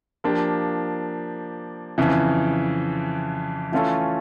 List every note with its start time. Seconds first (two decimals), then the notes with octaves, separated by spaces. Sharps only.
0.24 F3 A#3 D4 G4
1.98 F2 C#3 E3
3.72 E3 A3 C#4 F4 A4